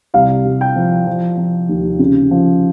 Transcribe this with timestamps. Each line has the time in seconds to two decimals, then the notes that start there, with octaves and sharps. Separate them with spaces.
0.14 C2 F5
0.45 C2
0.61 G5
0.76 F3
1.07 F3
1.37 F3
1.69 D#2
1.99 C#3
2.31 F3